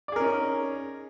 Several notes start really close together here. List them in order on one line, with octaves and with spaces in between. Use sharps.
D5 G#4 A#4 C#4 D#4